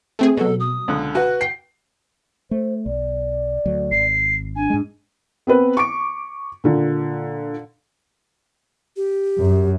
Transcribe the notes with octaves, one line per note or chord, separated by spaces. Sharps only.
A3 C4 G#4
B2 F#3 A4
D#6
C#2 D3
F#4 B4
G5 C7
A3 C5
B1 D5
D2 F#3
G#1 C7
D4 G#5
G#2 G#3
B3 C4 B4
C#6 D6 D7
A#2 D3
G4
F#2